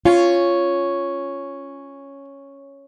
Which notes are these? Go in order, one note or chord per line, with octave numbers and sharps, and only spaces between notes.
C#4 F4